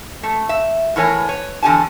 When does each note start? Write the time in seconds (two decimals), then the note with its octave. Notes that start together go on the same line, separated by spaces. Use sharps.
0.23 A3
0.49 E5
0.96 A2 E3 B3 A#4 C#5 G#5
1.28 B4 C#5
1.63 E2 D3 G4 G#5 A5